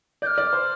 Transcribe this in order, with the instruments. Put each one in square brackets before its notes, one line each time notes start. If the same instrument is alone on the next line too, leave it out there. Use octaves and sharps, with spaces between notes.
[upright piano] D5 [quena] G6
[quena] F6
[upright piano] D5
C5